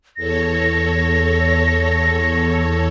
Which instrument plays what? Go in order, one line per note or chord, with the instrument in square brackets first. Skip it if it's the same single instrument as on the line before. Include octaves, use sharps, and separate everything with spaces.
[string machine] E2 A4 C#5 [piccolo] A#6